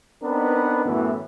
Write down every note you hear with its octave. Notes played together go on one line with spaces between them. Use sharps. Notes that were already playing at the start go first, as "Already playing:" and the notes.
B3 C4 D4 D#4 A#4 B4
F#2 A2 E3 A3 B3